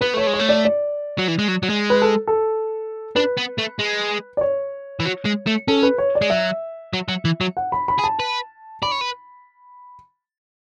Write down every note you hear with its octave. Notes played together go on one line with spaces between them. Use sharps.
B3 B4
A3 C#5
G#3
C#5
A3
D5
D5
F#3
E3
G#3
F#3
F#3
G#3
B4
A4
A4
D4 B4
B3
A3
G#3
D5
C#5
E3
F#3
G#3
A3
C#4 A4
B4
C#5
D5
G#3
F#3 E5
F#3
F#3
E3
F#3
F#5
B5
B5
G#4
A5
B4
D5 B5
C#5
B4